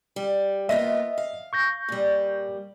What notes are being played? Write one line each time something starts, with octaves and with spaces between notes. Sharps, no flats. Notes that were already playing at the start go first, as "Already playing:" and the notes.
G3
A#3 B3 F4 D#5 E5
F5
C#6 G6 A#6
A#2 G3